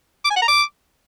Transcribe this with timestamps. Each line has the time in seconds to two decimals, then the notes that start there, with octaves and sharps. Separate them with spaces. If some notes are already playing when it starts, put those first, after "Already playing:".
0.24 D6
0.30 G#5
0.36 F#5
0.42 A#5
0.48 D6